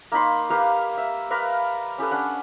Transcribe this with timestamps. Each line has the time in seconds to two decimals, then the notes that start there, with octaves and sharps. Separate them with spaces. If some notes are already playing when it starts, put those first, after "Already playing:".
0.12 A#3 D#4 B5 C6
0.50 A#3 G4 B4 F5
0.97 E5
1.30 A#4 B4 D5 F5
1.98 C#4 G4 A4 B4
2.11 C#4 D4 F#5